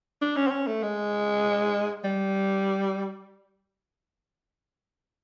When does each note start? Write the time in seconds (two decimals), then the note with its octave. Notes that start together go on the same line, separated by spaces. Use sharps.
0.22 D4
0.36 C#4
0.47 C4
0.51 C#4
0.67 A3
0.83 G#3
2.04 G3